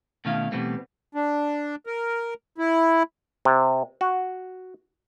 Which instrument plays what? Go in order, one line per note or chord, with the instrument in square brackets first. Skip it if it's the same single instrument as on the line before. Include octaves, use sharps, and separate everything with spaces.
[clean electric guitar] B2 D#3 A3 C#4 E4 F5
B2 E3 G3 A3 B3 C4
[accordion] D4
A#4
E4
[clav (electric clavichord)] C3
F#4